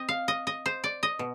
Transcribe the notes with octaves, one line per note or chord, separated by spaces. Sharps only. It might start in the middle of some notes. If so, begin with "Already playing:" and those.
Already playing: C4 D#5
F5
D#5
D#5
C5
D5
D#5
B2